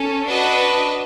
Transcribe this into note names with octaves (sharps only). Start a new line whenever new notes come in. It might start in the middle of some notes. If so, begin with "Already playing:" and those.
Already playing: C#4 A4
D4 F#4 B4 D#5